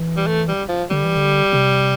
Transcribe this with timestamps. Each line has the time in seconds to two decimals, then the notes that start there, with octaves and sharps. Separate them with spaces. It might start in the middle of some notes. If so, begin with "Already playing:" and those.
Already playing: E3
0.17 G3
0.27 A3
0.48 G3
0.69 F3
0.90 D3 G3
1.04 E3
1.17 D3
1.53 C3